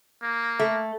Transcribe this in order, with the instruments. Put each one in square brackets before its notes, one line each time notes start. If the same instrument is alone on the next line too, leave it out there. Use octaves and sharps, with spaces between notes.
[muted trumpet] A#3
[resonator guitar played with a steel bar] A3